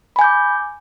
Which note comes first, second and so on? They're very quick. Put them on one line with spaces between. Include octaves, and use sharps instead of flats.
B5 G#5 G6 D6